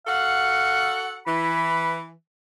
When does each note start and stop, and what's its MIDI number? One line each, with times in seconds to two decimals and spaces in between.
0.07 1.20 66
0.07 1.20 69
0.07 0.97 77
0.07 1.20 78
1.26 2.11 52
1.26 2.00 83